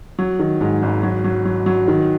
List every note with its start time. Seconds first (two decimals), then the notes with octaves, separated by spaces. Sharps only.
0.19 F#3
0.39 D#3
0.61 G#2
0.82 G#1
1.03 F#3
1.24 F#3
1.45 F#3
1.66 F#3
1.88 D#3